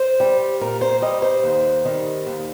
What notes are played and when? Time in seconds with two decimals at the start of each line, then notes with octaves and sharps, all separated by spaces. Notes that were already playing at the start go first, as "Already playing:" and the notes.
Already playing: C5
0.20 G3
0.61 A#2 A#4
0.81 C5
1.02 G3 D#5
1.22 C5
1.44 D#2
1.85 D#3 G3
2.27 D#2